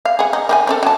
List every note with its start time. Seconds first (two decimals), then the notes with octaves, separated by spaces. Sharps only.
0.05 F5
0.19 G#4 F#5
0.33 D#4
0.49 D#3 E4 G#5
0.67 C4 C#4 A4
0.83 F#3 A5